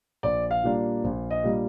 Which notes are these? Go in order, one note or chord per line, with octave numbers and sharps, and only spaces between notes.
A#1 D5
F5
A#2 G3 A#3 D4
A#1
D#5
A#2 G3 A#3 D4